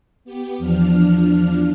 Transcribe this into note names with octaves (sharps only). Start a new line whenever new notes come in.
B3 G4
E2 F3 D4 F6